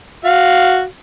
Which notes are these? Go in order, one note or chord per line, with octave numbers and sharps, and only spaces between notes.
F#4 F5